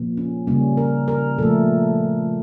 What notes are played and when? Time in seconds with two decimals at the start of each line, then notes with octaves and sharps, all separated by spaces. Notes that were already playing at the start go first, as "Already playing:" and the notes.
Already playing: A#2 F3 A#3
0.17 C#4
0.47 C#3 G3 A#3 C#4
0.77 A#4
1.08 A#4
1.38 A#2 F3 A3 A4